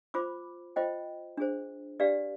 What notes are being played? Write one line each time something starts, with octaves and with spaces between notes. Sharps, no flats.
F4 C5 B5 D6
F4 C5 D#5 G5
D4 G#4 C5
D4 G4 B4 D5 F5